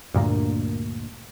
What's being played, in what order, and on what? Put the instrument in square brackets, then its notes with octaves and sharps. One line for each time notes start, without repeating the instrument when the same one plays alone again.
[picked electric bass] D2 G2 A#2 A#3